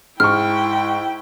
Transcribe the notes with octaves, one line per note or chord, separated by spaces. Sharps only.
G#2 E4 G5 C#6 F6